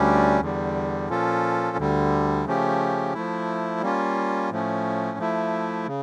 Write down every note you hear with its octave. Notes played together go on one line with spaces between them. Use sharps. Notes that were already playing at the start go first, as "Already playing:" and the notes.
Already playing: D2 D3 G3 C#4
E2 D3 G3
A#2 F3 C#4 F4 A4
D2 D3 G3
C#3 F3 A3 C#4 G4
F3 A3 E4
G3 A#3 C#4 F4
A2 F3 A3 C#4
F3 A3 E4
C#3